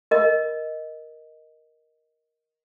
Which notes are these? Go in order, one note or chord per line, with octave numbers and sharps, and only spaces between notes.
A#4 D#5